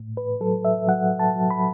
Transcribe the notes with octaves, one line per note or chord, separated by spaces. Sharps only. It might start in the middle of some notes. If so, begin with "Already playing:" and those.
Already playing: A2
B4
F#3 A4
E5
F#3 F#5
A5
F#3
B5